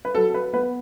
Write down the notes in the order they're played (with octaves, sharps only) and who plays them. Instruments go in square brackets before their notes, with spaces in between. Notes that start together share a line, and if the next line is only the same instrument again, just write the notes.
[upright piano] B4
[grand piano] F#3 [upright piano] A4
[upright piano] A4
B4
[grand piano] B3 [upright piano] B4